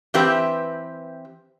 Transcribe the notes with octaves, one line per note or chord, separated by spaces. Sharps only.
E3 C4 G4 B4 E5